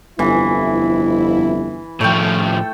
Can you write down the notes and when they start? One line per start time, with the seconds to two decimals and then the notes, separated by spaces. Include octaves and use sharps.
0.19 G1 F2 E3 E4
2.01 A2 F3 A3 A4 G5